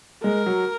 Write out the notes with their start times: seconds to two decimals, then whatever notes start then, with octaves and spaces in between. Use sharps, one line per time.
0.23 G#3 A#4
0.46 F#3